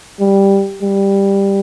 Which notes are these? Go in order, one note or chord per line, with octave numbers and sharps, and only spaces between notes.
G3
G3